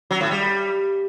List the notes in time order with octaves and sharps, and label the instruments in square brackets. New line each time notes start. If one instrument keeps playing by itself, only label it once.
[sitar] F#3
A2
G3